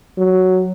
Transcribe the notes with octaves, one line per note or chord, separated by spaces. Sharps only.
F#3